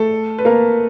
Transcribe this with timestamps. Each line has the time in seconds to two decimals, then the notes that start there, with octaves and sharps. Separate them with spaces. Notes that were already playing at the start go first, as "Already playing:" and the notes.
Already playing: A3 A4
0.38 B4
0.45 A#3 A#4